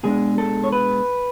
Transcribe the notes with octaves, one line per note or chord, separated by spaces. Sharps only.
B2 G#3 D4 G#4
A4
C#5
B4